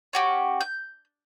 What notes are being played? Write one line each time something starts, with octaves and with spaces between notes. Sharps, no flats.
C#4 F#4 G4
G6